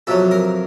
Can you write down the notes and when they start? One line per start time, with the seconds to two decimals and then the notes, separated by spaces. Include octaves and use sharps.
0.07 F2 C3 F#3 A4
0.31 A#4